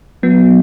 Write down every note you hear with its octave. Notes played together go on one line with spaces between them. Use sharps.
F#3 B3